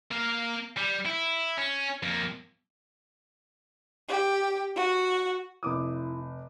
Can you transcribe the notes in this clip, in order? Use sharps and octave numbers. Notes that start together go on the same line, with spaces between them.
A#3 F5
G3
E4
C#4
F2 A#3
G4
F#4
F1 E4 D6 D#6